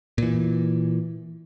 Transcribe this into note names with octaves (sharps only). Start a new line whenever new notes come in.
A#2 E3